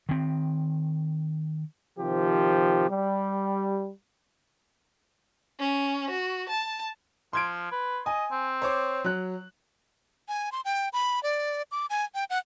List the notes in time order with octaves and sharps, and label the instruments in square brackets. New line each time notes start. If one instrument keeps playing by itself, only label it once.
[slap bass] D#3 C4
[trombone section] C3 D#3 F3 G4
G3
[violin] C#4
F#4
A5
[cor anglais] F3 [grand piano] C6 G#6 D7
[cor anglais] B4
[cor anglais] D#5 [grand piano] G#5
[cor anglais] C4
[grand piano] C5 C#5 D6
F#3 F#6
[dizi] G#5
C6
G5
B5
D5
D6
G#5
G5
F#5